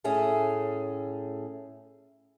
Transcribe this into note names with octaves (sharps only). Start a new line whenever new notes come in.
A2 A3 C#4 G#4